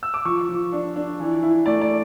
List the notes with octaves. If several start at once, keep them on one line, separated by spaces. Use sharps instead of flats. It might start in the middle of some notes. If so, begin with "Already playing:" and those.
E6
D6
F3 C#6
F3
D4
D4
E3
E4
A3 D5
D5